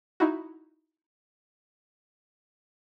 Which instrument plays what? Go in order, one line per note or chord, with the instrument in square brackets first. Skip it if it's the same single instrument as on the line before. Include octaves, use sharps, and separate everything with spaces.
[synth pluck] D#4 E4 F#4